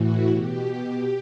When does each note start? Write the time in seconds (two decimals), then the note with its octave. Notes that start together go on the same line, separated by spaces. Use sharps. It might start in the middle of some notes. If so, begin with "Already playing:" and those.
Already playing: A2 E3 F#4
0.30 B2 G4